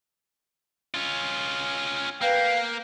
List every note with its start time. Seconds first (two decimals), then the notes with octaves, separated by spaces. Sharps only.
0.94 C#4 F4
2.21 A#3 B4 F5 G5